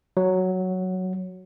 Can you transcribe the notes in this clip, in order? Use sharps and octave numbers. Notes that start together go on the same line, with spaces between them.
F#3